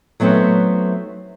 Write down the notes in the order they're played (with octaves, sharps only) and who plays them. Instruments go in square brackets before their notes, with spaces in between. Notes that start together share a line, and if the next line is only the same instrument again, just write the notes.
[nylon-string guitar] F#3 A3 B3 C4 D#4